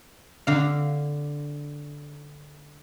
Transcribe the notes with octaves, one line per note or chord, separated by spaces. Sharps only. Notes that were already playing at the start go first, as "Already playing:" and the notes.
D3 F5